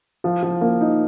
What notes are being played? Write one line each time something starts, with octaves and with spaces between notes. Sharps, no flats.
F3
F3
A#3
D#4